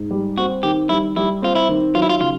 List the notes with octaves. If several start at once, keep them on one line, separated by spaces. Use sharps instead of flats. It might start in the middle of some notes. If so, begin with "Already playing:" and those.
Already playing: G#2
G3
C4 F#4
D#3 G4
G3 E4
G3 E4
C4 F4
E4
D#3
F#3 F4
E4
F4
C#3 F4